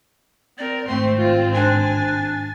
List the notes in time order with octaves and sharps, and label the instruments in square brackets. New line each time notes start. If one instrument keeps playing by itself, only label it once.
[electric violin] C4 A#4 [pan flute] D5
[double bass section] G#1 [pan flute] A3 [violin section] C4 [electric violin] C6
[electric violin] F4
[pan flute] D4 [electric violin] G#5 A6